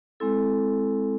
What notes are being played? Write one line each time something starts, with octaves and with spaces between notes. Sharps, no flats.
G#3 C4 E4 A4